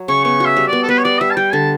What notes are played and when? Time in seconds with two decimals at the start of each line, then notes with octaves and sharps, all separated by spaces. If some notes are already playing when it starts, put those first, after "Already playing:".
Already playing: F#3
0.08 C#3 C#6
0.24 B3 C#6
0.40 F#4
0.45 E5
0.57 G3
0.68 B3 D5
0.83 A4
0.89 B3 B4
0.98 C#5
1.04 G3 D5
1.21 G3 E5
1.31 A5
1.36 G3 G5
1.53 D3 A5